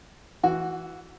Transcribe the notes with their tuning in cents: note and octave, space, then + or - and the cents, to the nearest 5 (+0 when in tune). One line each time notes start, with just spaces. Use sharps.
E3 +0 F#4 +0